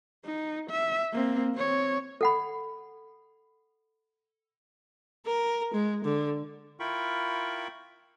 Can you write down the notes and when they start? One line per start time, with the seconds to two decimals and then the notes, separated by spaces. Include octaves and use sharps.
0.25 D#4
0.70 E5
1.12 A#3 C4
1.55 C4 C#5
2.21 A4 F#5 B5
5.26 A#4
5.74 G#3
6.04 D3
6.80 E4 F4 A#4 G5 B5 C#6